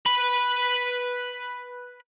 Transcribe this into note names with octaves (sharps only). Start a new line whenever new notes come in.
B4 B5